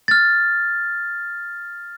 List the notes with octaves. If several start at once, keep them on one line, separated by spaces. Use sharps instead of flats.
F6 A6